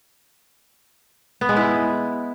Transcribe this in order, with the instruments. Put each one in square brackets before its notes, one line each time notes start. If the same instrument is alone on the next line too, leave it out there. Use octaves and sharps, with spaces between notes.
[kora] B3
G#3
E4